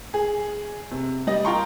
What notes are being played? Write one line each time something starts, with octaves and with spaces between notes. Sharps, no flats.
G#4
C3
G3 D#5
F4 A#4 G5 A#5 C6 C#6